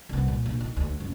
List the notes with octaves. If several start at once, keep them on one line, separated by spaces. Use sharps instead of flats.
C2 B3
A#2
A#1
D#3
D2
F#1